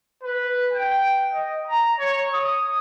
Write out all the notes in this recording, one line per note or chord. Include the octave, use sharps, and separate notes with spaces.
B4
G5
D#5
A#5
C#5
D#6